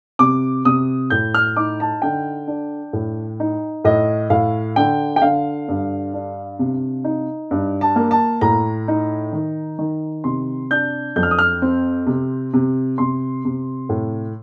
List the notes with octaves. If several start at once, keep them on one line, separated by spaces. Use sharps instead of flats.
C3 D6
C3 D#6
A2 G6
F6
D#4 D6
A5
D3 G5
D4
A2
D#4
A2 D#5
A2 F5
D3 G5
G5
D3 F5
G2
D4
C3
D#4
G2
A5
A#3
A5
A2 A#5
D#4
D#3
D#3
C3 C6
D4 G6
F2 G6
F6
D#6
F6
C4
C3
C3
C3 C6
C3
A2